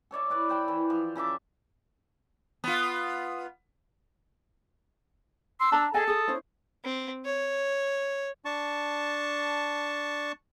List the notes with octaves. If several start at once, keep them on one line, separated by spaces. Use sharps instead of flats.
A4 C#5 D5 E5
E4 B4 D5
C5 G5 B5
E3
F3
C#3 A4 E5 D6
B3 F4
C6 E6
D4 A5 A#5
G#4 A4 D#5 G#5
G#4 D#6
C#4 E4 C5
C4
C#5
D4 A5 C#6